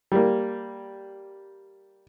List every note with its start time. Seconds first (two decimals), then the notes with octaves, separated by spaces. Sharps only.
0.12 G3 A#3